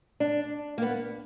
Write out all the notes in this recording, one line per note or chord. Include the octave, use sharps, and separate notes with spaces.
D4
A#3
B3